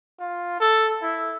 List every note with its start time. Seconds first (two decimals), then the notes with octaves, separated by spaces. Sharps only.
0.19 F4
0.60 A4
1.02 E4